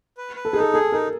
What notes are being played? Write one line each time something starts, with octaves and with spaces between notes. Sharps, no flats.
B4
B4
A4
D#4 G#4
A4
G#4 A4
D#4 A#4